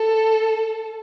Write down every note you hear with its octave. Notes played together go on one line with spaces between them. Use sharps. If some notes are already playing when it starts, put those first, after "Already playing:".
Already playing: A4